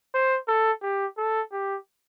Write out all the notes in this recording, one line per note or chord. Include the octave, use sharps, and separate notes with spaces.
C5
A4
G4
A4
G4